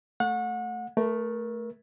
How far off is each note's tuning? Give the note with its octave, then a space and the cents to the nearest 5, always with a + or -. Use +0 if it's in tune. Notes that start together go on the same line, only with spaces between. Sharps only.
A3 +0 F#5 -30
A3 +0 A#4 +30